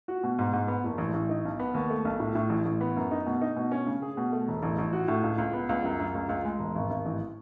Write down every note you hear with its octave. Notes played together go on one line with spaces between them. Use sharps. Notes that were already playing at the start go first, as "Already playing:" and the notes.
F#4
B2
G#2
G#2
B3
F#1
A1
A1
D#4
B1
B3
D#2
A3
B1
A2
A2
A1
A1
B3
F#2
D#4
B2
D#4
B2
C#4
C#3
G#4
B2
A3
E1
A1
A1
F#4
A2
C#2
C#2
B3
C#2
F#2
F#2
C#2
C#2
G#3
E1
G#1
G#1
A1